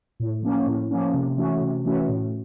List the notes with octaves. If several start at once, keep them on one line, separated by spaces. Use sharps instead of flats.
A2
F3 A#3 C#4
A2
F3 A#3 C#4
C3
E3 A3 C#4 F#4
C3
E3 A3 C#4 F#4
A2